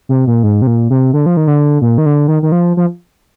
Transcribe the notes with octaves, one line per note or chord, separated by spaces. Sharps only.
C3
A#2
G#2
C3
A#2
C3
D3
F3
D#3
D3
A#2
D#3
D3
D#3
D#3
F3
F3